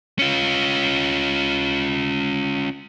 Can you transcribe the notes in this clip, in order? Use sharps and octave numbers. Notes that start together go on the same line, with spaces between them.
C#4 F4